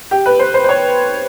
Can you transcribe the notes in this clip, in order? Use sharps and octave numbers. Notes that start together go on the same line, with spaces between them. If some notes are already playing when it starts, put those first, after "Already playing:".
G4
B4
C5
C5
C5
C#5